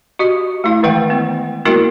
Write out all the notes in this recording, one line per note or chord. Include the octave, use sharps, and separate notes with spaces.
F#4 G4 D#5
A3 E4 F5
D#3 E3 G#3 B4 F#5 G5
B3
G#3 A#3 B3 E4 F#4 A#4